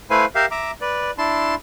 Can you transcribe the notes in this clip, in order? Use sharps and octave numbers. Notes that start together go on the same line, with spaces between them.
A3 E4 B4 C5 F5 G#5
G4 A#4 E5 F5
E5 A#5 D6
B4 D5
D4 E4 A5 C6